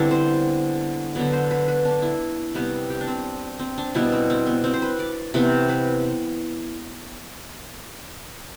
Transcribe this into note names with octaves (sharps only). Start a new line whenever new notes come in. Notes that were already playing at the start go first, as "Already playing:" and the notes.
Already playing: D3 G3 B3 C4 D4 E4
C5
D3 F#3 B3 D5
C5
B4
B4
D4
E4
C3 G3 B3
G4
D4
C4
C4
D4
B2 G3 B3 E4
C4
C4
B3
C4
C5
B4
D5
C3 E3 B3
B4